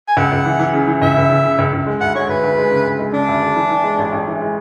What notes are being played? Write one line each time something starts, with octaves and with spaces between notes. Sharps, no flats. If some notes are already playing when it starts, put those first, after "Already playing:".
G#5
C#2 F#5
C#2
E3
E3
C#3
E3
C#2 E5
C#2
C#3
C#3
C#2
C#2
G#3
D2 F#5
G#3 C#5
D2 B4
D2
G#3
C#3
D2
G#3
C#3 D4
D2
D2
E3
E3
G#3
A1
A1
E3
G#3